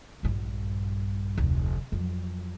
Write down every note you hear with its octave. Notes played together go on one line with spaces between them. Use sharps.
A#1 G2
F1 D2
F2 F#3